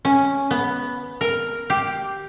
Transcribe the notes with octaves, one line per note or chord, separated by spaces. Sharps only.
C#4
B3
A#4
G4